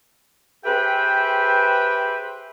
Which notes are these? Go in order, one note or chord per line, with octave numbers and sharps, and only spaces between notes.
G4 G#4 B4 C5 E5 G5